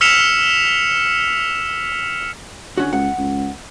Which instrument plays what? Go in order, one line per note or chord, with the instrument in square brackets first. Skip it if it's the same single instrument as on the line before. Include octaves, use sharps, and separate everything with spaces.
[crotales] E6 F6 B6 C#7 E7 F7
[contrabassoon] D3 [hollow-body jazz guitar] C#4 F#4
[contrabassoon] C#2 [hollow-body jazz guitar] F#5
[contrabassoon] C#2